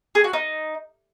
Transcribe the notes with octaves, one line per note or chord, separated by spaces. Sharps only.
G#4
F#4
D#4